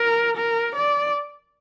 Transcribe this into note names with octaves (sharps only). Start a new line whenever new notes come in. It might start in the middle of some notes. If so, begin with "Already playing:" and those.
Already playing: A#4
A#4
D5